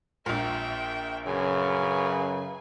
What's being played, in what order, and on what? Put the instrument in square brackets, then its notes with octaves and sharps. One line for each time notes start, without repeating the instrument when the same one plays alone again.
[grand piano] A#1 A#2 [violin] E5 G5
[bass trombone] F#2 [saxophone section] C#3 [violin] B4 G#5